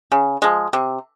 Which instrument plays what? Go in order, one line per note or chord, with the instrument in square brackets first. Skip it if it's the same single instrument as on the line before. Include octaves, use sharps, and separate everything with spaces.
[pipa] C#3
F3 G#3
C3